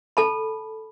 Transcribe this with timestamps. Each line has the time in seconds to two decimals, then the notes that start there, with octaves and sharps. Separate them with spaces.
0.17 A4 A5 B5